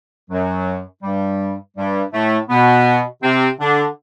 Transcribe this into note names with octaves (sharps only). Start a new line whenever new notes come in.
F#2 F#3
G2 G3
G2 G3
A2 A3
B2 B3
C3 C4
D3 D4